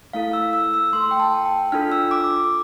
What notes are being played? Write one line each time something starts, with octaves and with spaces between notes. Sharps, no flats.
A3 E4 A4 F5
E6
E6
E6
A3 E4 A4 C6
G5
A5
G5
D4 F4 A4 F6
E6
D6